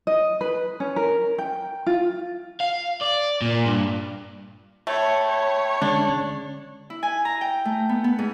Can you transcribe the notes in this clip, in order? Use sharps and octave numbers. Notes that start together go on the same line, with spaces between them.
D#5
B4
C#4
A#4
G5
F4
F5
D5
A#2
G2
A3 C#5 G5 B5
C#5
D3 G#3 C#4 D4
E4
G#5
A#5
G5
A3
B3
B3
G#2